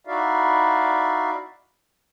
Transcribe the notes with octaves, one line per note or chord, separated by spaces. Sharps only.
D#4 E4 F#4 D5 E5 F5